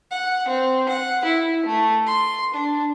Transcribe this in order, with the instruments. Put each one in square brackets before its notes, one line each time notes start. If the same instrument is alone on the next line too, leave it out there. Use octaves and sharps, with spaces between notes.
[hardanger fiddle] F#5
C4
F#5
E4
A3
C6
D4